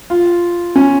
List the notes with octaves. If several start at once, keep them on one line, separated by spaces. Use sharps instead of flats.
F4
C#4